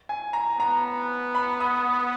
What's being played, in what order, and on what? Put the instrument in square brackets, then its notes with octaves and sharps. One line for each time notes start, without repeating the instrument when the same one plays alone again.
[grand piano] G#5
A#5
[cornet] B3 [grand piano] A#5
[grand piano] B5
D#6